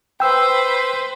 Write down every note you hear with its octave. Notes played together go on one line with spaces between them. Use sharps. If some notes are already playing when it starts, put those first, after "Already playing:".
B4 C5 G5 E6